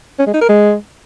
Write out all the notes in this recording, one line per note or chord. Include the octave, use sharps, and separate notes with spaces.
C#4
G#3
D#4
A#4
G#3